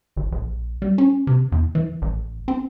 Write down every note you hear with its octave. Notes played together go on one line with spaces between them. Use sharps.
G#1
A#1
G3
C#4
C3
E2
E3
A1
C4